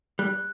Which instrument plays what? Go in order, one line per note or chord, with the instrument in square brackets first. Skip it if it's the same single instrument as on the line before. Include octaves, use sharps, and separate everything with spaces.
[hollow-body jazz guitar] G3 [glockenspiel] F#6